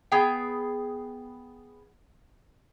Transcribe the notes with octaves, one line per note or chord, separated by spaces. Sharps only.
B3 G#4 G5